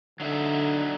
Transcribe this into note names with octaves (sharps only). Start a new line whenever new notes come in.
D3 F#3 D#4 E5